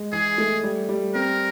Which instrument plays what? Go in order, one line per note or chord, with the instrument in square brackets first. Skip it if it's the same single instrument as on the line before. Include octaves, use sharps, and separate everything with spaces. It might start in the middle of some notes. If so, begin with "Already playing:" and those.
Already playing: [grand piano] G#3
[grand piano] E3 [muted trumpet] G#4
[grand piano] A3
G3
G3
[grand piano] C4 [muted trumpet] A#4